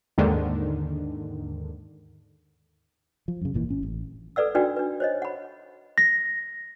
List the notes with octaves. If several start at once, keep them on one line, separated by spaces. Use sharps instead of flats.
D#2 G#2 D3 D#3
F3
F#2 C#3
G#1 A#2 E3
G#1 C#4
A1
A4 B4 D5 F#5 E6
D4 D#4 F#4 B4 D5 G5
D4 B4
C5 C#5 D#5
F#5 B5
A#6